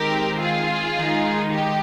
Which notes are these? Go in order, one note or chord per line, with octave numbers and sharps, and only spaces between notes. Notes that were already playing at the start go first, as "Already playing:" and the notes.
Already playing: D#3 G#3 C4 G4 A#4
F4 G#4
D#3 G#3 D#4
G4